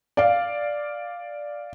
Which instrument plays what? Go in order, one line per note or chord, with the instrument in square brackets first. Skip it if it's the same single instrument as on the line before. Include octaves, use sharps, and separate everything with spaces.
[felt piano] D5 F5